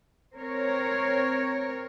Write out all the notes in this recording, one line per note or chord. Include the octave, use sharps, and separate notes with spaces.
C4 A#4 C#5